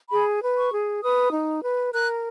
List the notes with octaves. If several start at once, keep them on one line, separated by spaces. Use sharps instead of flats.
G#4 B5
B4
C#6
G#4
B4 D#6
D#4
B4
A#4 F#6